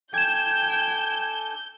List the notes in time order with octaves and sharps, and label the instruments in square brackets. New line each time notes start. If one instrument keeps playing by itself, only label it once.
[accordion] A4 G#5 D6 [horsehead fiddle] G5 [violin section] G6 [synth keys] G#6 E7